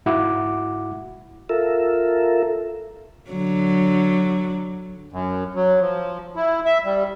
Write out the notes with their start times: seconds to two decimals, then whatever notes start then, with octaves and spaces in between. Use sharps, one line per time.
0.06 G#2 E4 F#4 F#5 D6
1.49 F4 A4 A#4 E5
3.29 D3 F#3
5.12 F#2
5.55 F#3
5.81 F3
6.36 E4
6.66 E5
6.85 G3